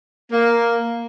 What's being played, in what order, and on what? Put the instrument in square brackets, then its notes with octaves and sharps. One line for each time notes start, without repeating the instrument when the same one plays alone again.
[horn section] A#3